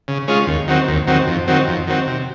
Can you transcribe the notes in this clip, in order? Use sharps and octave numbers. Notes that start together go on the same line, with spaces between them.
C#3
G#3 C#4 F4
D#2
D#3 F#3 C4
D#2
D#3 F#3 C4
F2
D#3 F#3 C4
F2
D#3 F#3 C4
C3